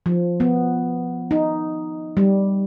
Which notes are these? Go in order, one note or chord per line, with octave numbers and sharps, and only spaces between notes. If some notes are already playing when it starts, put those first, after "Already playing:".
F3
B3
D#4
G3